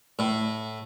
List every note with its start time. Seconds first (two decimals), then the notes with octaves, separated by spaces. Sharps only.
0.19 A2